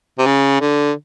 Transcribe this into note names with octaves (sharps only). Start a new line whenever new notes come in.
C3
C#3
D3